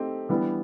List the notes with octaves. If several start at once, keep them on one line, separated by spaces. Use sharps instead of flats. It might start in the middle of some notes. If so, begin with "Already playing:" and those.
Already playing: A3 C4 D#4 G4
E3 G3 B3 D4